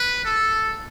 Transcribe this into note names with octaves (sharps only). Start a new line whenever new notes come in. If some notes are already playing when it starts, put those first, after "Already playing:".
Already playing: B4
A4